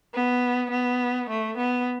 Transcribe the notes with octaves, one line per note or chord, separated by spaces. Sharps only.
B3
B3
A3
B3